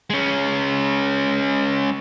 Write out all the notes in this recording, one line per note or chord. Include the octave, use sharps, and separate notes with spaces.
G#3 C#4